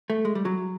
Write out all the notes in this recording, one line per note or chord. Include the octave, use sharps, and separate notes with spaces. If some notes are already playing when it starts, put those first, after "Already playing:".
A3
G#3
G3
F#3